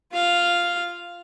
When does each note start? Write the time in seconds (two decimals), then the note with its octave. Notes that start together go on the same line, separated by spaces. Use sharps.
0.12 F4 F5